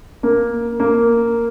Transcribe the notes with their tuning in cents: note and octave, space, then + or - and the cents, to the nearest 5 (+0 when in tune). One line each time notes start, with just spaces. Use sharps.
A#3 +5
A#3 -5